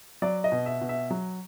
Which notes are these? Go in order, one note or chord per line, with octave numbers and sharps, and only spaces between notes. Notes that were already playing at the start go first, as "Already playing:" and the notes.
F#3 D5
D#5
B2
E5
B2
E5
F#3